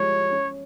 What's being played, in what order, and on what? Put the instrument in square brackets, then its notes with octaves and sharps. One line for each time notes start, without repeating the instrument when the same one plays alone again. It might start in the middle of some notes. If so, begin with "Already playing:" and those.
Already playing: [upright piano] F3 G3 G#3 [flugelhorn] C#5
[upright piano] C#4